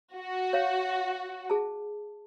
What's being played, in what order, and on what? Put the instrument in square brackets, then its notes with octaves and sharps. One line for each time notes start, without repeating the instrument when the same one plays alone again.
[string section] F#4
[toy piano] C#5 F5
G#4 A5